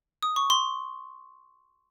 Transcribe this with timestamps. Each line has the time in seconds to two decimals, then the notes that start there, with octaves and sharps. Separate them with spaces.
0.23 D#6
0.36 C#6
0.50 C6